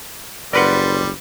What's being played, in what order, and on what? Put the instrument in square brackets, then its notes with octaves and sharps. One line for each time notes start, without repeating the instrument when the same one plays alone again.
[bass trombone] F#1 [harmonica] G3 [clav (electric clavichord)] A#4 B4 F#5 [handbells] D5 B5 C6